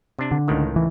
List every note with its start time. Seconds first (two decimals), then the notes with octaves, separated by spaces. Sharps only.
0.19 C3 D4
0.31 D3
0.48 C#2 A2 D#3
0.76 E3